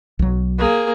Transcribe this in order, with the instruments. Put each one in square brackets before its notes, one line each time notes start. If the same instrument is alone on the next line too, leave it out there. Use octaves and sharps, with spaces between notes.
[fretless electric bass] B1 F#3
[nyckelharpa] A#3 G#4